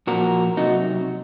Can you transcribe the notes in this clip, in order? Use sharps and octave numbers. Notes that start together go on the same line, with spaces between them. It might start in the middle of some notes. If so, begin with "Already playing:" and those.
A#2 F3 F#4 A#4
C3 F#3 D#4 F#4